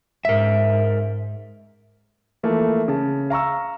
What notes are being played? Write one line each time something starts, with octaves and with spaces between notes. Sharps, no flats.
G#2 A#4 E5
E3 F3 A3 A#3 A#4
C#3 A5
F5 A#5 C#6 E6